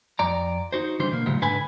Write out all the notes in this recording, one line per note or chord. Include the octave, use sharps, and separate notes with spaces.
F2 D5 A#5
D#4 F#4 C5
D3 E3 G3 D4 C5
B2 A#3
D2 A2 C#3 F#3 G3
G#2 D3 B4 G#5 B5